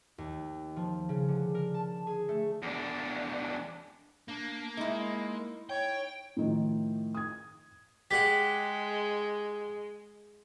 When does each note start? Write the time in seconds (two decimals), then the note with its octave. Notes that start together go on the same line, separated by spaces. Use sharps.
0.18 D#2
0.76 F3
1.09 C#3
1.28 D3
1.55 A#4
1.74 A5
2.07 G#4
2.29 A3
2.62 E2 D4
4.28 A#3 D4
4.77 G#3 D#4 E4
5.70 C#5 G5
6.37 A2 D#3 F3
7.15 D#6 G#6
8.11 G#3 G4 G#4 F#5 B6